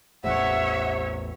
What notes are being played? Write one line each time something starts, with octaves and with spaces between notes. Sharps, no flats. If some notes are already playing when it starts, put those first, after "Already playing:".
A1 E2 A2 C3 C#5 E5 F#5